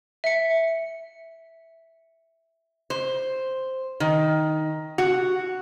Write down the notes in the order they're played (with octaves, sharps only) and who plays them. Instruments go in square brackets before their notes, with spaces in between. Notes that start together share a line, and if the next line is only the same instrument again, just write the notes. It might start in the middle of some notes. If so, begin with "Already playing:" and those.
[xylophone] E5 C#7
[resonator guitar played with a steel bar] C5
D#3
F#4